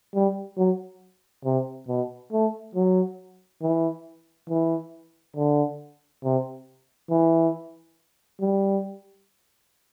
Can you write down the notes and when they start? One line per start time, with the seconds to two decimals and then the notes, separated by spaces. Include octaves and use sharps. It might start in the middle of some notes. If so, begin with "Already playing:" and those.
0.14 G3
0.58 F#3
1.45 C3
1.88 B2
2.33 A3
2.75 F#3
3.62 E3
4.50 E3
5.36 D3
6.24 C3
7.10 E3
8.41 G3